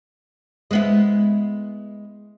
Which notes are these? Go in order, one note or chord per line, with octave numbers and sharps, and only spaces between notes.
G#3 B3 E4